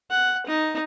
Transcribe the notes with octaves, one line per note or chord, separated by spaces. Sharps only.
F#5
D#4